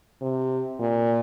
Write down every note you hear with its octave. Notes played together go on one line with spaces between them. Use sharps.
C3
A#2